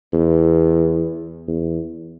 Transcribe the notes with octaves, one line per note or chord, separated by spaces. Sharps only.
E2
E2